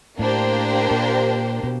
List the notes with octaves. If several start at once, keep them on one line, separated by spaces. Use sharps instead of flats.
A2 A#3 D4 G4 C5
A#2
B2